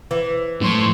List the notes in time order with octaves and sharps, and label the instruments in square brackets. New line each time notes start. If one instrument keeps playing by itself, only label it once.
[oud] E3
[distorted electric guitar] A2 [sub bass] F3 [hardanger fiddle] C6 C#6